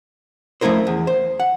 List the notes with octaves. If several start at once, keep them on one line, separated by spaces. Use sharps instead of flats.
F3 A3 C#4 E4 A#4 C5
E2
C5
F#5